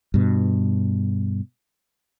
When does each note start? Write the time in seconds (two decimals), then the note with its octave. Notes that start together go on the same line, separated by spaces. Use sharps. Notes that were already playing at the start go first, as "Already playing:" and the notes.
0.14 G2 B2